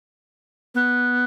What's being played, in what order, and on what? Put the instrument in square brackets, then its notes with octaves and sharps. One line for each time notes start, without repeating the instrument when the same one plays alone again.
[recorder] B3